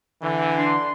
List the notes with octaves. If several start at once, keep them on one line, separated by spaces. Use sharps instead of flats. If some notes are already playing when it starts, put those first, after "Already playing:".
D3 E3
D4 C6